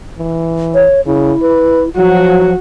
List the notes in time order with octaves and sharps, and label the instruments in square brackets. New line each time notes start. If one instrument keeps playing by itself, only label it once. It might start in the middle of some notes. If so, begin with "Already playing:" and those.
[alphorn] E3
[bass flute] C#5
[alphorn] C#3 [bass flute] E4
[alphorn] B4
[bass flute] F3 [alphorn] F#3 [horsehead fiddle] F#4